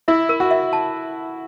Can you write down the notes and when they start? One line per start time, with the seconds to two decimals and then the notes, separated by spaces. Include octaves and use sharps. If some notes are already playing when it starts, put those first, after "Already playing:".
0.08 E4 E5
0.29 A#4
0.40 F#4
0.51 E5
0.73 A5